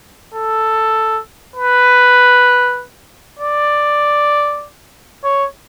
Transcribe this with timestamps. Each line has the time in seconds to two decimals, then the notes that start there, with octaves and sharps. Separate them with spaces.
0.34 A4
1.56 B4
3.39 D5
5.24 C#5